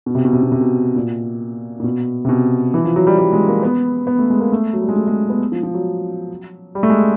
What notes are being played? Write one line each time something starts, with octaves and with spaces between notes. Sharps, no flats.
B2
C3
B2
C3
B2
C3
B2
A#2
A#2
B2
C3
B2
E3
F3
F#3
G3
G3
G#3
A#3
B3
B3
A3
G#3
A#3
A3
F#3
G3
G#3
A3
G#3
B3
F3
F3
F#3
G3
A3
G#3